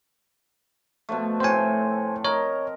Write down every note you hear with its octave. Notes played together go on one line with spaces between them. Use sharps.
B2 F3 A3
A2 C4 C5 G#5
A#4 C#5 D#5